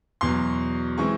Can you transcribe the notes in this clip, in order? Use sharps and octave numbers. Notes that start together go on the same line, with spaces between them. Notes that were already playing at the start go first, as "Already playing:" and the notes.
E2 B2 F#3 C6
E3 G#3 C4 C#6